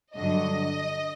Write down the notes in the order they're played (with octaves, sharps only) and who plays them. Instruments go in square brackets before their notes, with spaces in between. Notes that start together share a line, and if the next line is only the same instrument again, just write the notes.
[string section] G2 D3 F#3 D#5